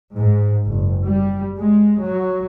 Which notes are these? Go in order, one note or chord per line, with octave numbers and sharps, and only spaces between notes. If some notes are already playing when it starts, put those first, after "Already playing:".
G#2
F#1
G3
G#3
F#3